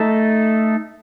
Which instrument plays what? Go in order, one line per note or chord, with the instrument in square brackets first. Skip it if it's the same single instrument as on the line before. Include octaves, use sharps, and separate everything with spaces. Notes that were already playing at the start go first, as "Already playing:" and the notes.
Already playing: [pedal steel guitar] A3 D#4 A4